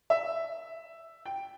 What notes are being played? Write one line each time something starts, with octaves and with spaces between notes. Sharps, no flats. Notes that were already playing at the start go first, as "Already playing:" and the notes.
E5
G5